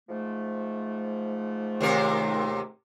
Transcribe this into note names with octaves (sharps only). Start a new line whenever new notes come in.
G#2 F3 A3
D#2 C3 A#4